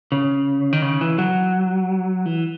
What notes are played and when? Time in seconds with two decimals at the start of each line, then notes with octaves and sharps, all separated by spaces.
0.12 C#3
0.73 D#3
0.82 C#3
1.01 E3
1.18 F#3
2.26 E3